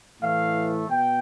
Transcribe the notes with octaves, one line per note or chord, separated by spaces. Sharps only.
A2 E3 A3 F5
B2 G5